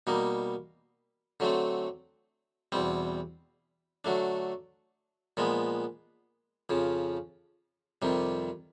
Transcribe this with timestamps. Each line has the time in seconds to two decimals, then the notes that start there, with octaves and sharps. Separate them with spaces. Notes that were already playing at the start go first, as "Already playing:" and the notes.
0.07 B2 G3 A#3 D#4
1.40 D3 F#3 A3 C4
2.72 E2 B2 G3 C4
4.05 D3 F#3 A3 D4
5.37 A#2 F3 G#3 B3
6.70 F2 C#3 F3
8.02 F2 C3 D#3 G3